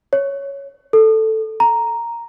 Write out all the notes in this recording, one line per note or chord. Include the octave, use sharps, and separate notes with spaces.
C#5
A4
A#5